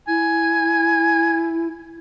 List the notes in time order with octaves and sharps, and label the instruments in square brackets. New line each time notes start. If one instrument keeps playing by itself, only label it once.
[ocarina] E4 [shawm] G#5